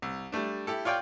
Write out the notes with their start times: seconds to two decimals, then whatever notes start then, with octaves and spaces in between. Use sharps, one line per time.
0.02 C2
0.32 G3 A3 D4
0.67 E4 G4 A4
0.85 F4 C#5 D5 F5 G5